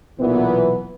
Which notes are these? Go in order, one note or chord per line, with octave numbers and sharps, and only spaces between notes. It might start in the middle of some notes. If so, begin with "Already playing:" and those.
B1 A#2 E3 B3